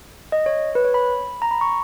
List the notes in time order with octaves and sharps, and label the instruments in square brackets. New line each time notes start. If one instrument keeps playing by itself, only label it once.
[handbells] D#5
C#5
B4
C#5
B5
A#5
B5
C#6